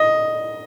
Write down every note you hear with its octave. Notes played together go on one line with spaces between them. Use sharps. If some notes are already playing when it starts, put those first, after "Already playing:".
Already playing: D#5